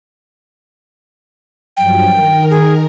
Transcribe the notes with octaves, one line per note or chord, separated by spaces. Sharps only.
G2 F3 F#3 G5
D#3 A#4
G#4